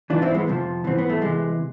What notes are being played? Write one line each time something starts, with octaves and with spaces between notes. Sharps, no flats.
G#2 E3 D4 F4
C4 E4
G#3 B3
F2 C3 F3
G#2 E3 C4
B3
A3
E2 C3 E3 G#3